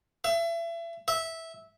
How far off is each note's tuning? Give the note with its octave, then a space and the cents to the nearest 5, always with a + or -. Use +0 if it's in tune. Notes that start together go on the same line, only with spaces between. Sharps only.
E5 +35
E5 -10